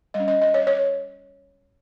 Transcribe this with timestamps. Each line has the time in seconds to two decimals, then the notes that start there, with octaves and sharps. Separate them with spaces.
0.14 G3 D#5
0.20 C#4
0.28 D#5
0.42 D#5
0.54 C#5
0.67 C#5